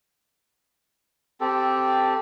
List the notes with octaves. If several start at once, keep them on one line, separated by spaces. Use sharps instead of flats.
C4 G4 A4